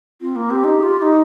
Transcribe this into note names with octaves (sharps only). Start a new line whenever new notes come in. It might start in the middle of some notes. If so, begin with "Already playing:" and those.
C4 F4
A#3
C4 G4
D#4
G#4
F4
F4
D#4